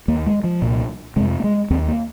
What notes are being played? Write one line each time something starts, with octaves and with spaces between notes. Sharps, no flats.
D#2 A#3
G#3
F3
C2 A#2
F2 C3 G#3
A#3
G#3
D#2 C4
A#3